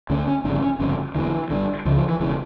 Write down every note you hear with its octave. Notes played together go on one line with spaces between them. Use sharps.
D2 D3 C#4
C#4
G1 F2 C#3 D4
C#4
G1 F2 C#3 C#4
E1 E2 D3 E3
G1 G2 D3
C#2 C#3 F3
F3
E3
E1 C#3 E3